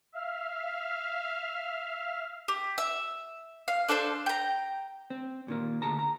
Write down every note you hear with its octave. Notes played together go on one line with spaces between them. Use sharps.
E5 F5 F6
G4
E5 E6
F5
D4 A4 C5 F5
G5 A#5
C4
A#2 D#3 A#3
D2 G#4 A5 A#5
A#5